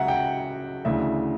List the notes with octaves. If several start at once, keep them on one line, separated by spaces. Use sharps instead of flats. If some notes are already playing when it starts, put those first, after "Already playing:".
Already playing: C#2 C#3 F#3 E5 F#5 A#5
G5
D2 C#3 E3 E5